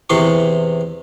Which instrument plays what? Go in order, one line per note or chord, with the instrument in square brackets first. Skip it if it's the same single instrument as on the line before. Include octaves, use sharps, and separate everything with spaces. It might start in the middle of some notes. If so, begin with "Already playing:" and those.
[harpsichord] E2 C3 E3 C6 C#6